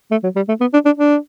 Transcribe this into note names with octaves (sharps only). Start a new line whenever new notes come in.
A3
F#3
G3
A3
B3
D4
D4
D4